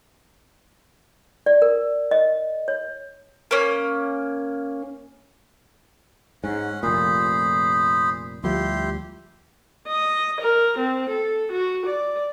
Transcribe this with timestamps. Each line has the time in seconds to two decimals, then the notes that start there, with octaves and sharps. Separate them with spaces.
1.46 D5
1.62 A#4
2.11 D#5
2.68 C#5
3.51 A#3 C#4
6.44 G#2 C#4 F#5
6.83 F1 A#2 G#4 C5 B5
8.44 D2 F3 G3 E4 G4 C6
9.88 D#5
10.41 A#4
10.78 C4
11.09 A4
11.51 F#4
11.86 D5